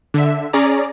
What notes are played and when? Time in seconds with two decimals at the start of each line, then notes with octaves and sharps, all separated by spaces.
0.14 D3 E5
0.53 C#4 G#4 D5 A#5